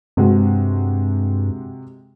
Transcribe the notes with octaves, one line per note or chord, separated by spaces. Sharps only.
G2 C3 G#3 F#4